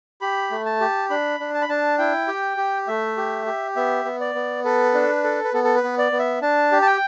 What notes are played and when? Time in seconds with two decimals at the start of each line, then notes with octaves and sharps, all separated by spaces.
0.21 G4 B5
0.51 A3
0.65 A5
0.80 G4
1.10 D4 B5
1.40 D4
1.54 A5
1.62 B5
1.69 D4 A5
1.98 E4 G5
2.28 G4
2.57 G4
2.88 A3 E5
3.17 G4
3.46 G4
3.76 B3 E5
4.05 B3
4.20 D5
4.35 B3
4.64 A4 B4
4.94 D4
5.24 A4
5.44 B4
5.54 B3 A4
5.64 A4
5.75 B4
5.83 B3
5.98 D5
6.12 B3
6.19 E5
6.42 D4 A5
6.72 G4
6.82 A5
6.86 G5